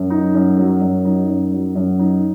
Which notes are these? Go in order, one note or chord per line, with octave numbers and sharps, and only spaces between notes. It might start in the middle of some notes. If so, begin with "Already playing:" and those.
Already playing: F#2
D#4
F#2
F#3
F#2
D#4
F#2
F#3
F#2
D#4